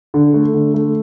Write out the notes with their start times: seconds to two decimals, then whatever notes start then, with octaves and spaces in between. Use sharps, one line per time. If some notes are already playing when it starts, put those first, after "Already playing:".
0.14 D3
0.34 A3
0.54 D3
0.74 A3